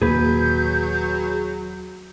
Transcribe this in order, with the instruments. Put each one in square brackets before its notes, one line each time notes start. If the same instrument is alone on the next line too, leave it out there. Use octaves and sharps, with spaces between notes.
[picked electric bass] D#1 A#3 [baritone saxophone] F#3 [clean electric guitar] G#4 B4 [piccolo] G6